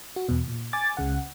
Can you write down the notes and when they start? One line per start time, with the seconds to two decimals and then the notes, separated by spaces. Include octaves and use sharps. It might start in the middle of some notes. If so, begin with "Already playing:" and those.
0.16 F#4
0.29 E2 B2
0.48 A#2
0.73 G#5 D6 A6
0.97 C#2 C#3 F#5